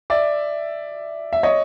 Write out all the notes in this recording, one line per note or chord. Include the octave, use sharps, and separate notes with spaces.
D5 E5
E5
C#5 D#5